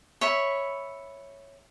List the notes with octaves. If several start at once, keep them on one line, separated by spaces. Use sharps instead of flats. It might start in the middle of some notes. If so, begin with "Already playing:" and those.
C#5 E5 B5